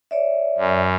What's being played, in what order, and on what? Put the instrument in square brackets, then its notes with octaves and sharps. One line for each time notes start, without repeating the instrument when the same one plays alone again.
[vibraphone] C#5 D5 E5
[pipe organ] F#2